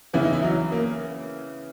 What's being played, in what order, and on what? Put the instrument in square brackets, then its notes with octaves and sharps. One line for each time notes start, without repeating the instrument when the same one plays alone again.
[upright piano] C#3 E3 B3 [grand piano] E4
[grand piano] D#4
E4
F#3
A#3